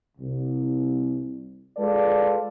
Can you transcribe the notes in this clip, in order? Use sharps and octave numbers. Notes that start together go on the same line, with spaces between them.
C2
G#3 F4 A4 B4 D5